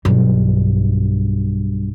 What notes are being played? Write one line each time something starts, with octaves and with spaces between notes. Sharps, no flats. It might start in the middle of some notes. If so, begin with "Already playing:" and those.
B1 G2